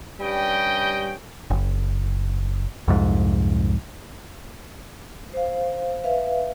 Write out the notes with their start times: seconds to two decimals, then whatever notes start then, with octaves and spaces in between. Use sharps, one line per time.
0.20 G2 G3 C#4 D#5 G5
1.50 F#1
2.88 C2 F2 G#2
5.33 C5 F5
6.04 B4 E5 F5